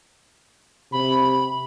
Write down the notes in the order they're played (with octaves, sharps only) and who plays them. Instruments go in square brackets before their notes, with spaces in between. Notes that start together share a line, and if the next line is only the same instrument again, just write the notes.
[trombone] C3 [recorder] B5